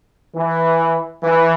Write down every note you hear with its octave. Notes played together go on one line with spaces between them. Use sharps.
E3
E3